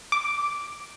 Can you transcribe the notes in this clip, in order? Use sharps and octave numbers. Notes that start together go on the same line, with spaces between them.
D6